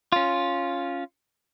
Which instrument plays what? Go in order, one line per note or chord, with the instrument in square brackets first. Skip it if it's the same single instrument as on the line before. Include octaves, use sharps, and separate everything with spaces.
[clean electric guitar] C#4 F4